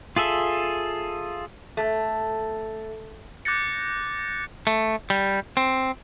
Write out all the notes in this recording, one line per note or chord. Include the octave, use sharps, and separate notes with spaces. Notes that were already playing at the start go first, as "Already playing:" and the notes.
F4 G#4 A4 E5
A3
D6 F#6 G6 A6 A#6 C#7
A3
G3
C4